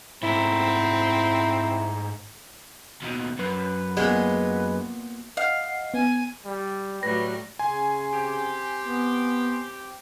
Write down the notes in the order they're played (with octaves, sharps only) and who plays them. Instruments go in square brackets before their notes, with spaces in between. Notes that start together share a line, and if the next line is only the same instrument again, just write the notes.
[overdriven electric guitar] G#2 A3 [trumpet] C4 [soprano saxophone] E4 [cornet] A#5
[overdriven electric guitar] D#2 B2
[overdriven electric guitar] F#2 [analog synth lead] B4
[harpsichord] A#2 B3 [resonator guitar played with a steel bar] G#3
[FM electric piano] D#5 F#5 [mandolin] F5
[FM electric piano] B3 [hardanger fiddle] G#5
[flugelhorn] G3
[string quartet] A2 F#3 G3 [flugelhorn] B4 [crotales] A#6
[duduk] C#3 [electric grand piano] G#5 [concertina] C6
[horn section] C4 G4
[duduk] B3